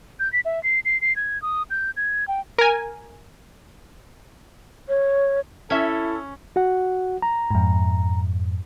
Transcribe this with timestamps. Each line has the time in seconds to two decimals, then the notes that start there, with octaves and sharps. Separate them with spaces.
0.20 G6
0.33 B6
0.45 E5
0.63 C7
0.85 C7
1.01 C7
1.16 G#6
1.42 D#6
1.70 G6
1.97 G#6
2.28 G5
2.58 A#4 G#5
4.88 C#5
5.70 C#4 E4 A4 E5 G#6
6.56 F#4 F#5
7.22 A#5
7.51 F2 G#2